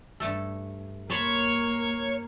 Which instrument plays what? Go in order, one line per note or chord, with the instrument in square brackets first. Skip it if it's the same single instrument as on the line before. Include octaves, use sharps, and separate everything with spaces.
[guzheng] G2 A3 A4
[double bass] A#3 [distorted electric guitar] C#5 [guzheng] A5 B5 C6